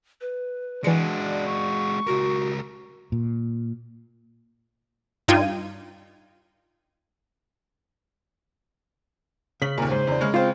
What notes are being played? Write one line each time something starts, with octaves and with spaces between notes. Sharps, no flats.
B4
E3 G#3 D4 F#4 D5 C#7
C#6
C#2 F#4 A#4
A#2
G2 D#4 F4 G5 G#6 D#7
C#3 B6 F#7
D#2 A#2 A#4
G#2 C5
E2 D4
C#3 G#3 F6
C4 F4 C5